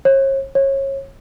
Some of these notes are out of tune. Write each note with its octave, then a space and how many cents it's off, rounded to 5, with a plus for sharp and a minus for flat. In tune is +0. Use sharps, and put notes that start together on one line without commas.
C#5 -40
C#5 -25